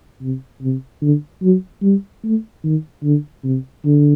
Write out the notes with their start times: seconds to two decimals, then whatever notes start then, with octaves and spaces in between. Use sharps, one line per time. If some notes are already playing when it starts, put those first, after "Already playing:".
0.22 C3
0.62 C3
1.02 D3
1.42 F#3
1.82 G3
2.24 A3
2.64 D#3
3.03 D3
3.44 C3
3.85 D3